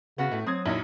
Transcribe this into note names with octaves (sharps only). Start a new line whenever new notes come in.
C#3 B3 C#4 F#4
A2 A3
F#3 C4 D#6 G#6
A#1 F#2 D#4 E4